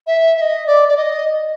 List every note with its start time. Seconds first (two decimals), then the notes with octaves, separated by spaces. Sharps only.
0.07 E5
0.37 E5
0.41 D#5
0.67 D5
0.88 D5
0.97 D#5